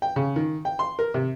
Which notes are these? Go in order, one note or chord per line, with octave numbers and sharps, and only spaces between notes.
G5
C#3
D#3
G5
C6
A#4
C3